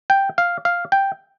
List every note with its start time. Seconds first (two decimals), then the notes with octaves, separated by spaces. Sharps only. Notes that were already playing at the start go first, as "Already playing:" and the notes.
0.10 G5
0.38 F5
0.65 F5
0.92 G5